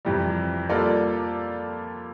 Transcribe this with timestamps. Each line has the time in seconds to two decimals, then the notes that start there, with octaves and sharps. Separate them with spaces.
0.05 F2 C3 E3 G3
0.69 G3 A#3 F4 A4 D5